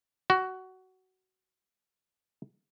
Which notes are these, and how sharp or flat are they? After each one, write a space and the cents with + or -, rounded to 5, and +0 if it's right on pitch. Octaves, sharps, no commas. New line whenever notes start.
F#4 +15